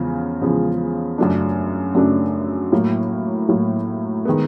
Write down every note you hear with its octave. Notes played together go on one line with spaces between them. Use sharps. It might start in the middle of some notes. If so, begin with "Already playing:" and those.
Already playing: E2 C#3 F3 G#3
E2 C#3 F3 G#3
F#2 C#3 F#3 A3 D4
F#2 C#3 F#3 A3 D4
A2 F#3 A#3
A2 F#3 A#3
D#3 G#3 B3